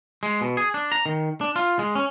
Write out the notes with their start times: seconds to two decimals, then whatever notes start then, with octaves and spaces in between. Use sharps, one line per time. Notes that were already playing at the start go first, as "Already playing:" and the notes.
0.23 G#3
0.41 B2
0.57 G#4
0.74 D4
0.92 A#5
1.06 D#3
1.41 D4
1.56 F4
1.79 G#3
1.95 C#4